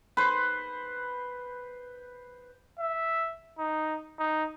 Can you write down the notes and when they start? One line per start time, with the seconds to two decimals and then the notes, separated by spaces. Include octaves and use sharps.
0.17 B4 C5
2.80 E5
3.58 D#4
4.19 D#4